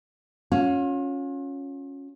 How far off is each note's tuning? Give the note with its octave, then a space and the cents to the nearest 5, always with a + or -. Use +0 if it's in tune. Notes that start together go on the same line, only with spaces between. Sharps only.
C#4 +0 F4 +40